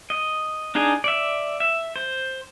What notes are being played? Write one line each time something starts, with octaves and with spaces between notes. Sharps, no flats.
D#5
D4 D#4 G#4 D#5
D5 E5
E5
C5